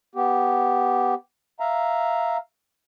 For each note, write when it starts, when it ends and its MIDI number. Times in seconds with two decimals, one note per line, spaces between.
0.15 1.15 59
0.15 1.15 67
1.60 2.37 76
1.60 2.37 77
1.60 2.37 82